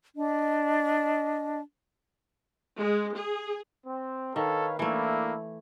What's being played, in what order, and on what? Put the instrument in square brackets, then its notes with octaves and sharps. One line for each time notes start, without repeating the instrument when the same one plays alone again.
[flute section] D4 D#5
[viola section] G#3
G#4
[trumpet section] C4
[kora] D#3 [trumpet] A4 [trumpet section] B4 C#5 F5
[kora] E3 A3 [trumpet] A#3 [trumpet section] D4 E4 A4